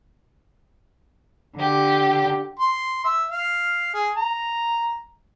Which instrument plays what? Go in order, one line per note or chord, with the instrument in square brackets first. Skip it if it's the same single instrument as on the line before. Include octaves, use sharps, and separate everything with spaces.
[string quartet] D3 G4
[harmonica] C6
E5
F5
G#4
A#5